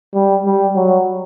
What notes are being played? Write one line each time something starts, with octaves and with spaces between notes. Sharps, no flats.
G3
G3
F#3